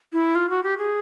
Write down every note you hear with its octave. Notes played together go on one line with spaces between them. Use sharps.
E4
F4
F#4
G4
G#4